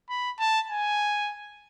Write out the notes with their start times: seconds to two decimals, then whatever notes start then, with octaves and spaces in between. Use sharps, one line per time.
0.09 B5
0.39 A5
0.70 G#5